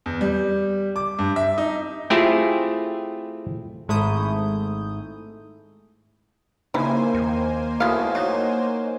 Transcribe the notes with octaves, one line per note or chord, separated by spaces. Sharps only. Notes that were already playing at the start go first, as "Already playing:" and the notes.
E2
G3
D6
G2
E5
D#4
A3 C4 E4 F4 G4 G#4
G#1 G#2 A3 E4 D#6 G6
C#3 A#3 D#4 E4 G4 C5 G#5
D#2
B1 B2 A3 E4 F5
F#3 D#4